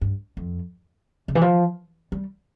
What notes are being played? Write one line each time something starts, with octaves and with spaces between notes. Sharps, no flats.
G2
F2
C#3
E3
F3
G3